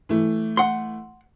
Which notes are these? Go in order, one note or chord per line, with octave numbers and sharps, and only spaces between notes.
E3 A3
F#5 C6